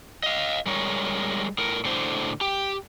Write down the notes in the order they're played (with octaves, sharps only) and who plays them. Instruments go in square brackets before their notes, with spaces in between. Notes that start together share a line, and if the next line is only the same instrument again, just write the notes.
[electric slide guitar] D#5 F5
G3 G#3 A#4 C#5
A2 A#4
A2 D3 C5
G4